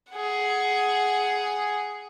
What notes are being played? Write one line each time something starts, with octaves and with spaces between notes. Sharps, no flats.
G#4 F#5